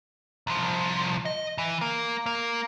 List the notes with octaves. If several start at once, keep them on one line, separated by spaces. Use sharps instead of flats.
C2 F3
D#5
E3
A#3
A#3